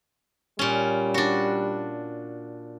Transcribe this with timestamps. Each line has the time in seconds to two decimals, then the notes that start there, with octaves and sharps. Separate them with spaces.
0.59 A#2 G3 C#4
1.14 D4 F#4